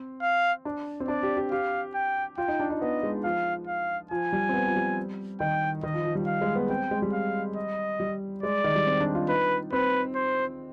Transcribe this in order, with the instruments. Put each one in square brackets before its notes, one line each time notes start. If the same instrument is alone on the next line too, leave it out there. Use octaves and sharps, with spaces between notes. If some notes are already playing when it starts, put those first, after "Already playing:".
Already playing: [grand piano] C4
[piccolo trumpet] F5
[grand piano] D4
C4
[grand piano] D4 [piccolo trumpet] D5
[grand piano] G4
G4
[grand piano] G4 [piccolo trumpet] F5
[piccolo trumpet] G5
[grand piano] F4 [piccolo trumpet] G5
[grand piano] D#4
D4
D#4
[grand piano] B3 [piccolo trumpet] D#5
[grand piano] G#3
[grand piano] F3 [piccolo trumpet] F5
[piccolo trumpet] F5
[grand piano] F3 [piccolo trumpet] G#5
[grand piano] G3
C4
B3
F3
G3
[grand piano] D#3 [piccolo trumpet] G5
[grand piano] D#3 [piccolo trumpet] D#5
[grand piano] F3
F3
G3
[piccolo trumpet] F5
[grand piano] G#3
B3
[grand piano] C4 [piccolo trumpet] G5
[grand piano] G#3
G3
[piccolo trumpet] F5
D#5
[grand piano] G3
[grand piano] G#3 [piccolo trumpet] D5
[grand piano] D#3
G3
C4
D4
F4
[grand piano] D#4 [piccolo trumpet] B4
[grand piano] C4 [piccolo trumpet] B4
[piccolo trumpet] C5